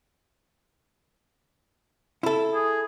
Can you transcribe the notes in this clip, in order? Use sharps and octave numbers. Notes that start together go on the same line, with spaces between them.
E4 A4
G#4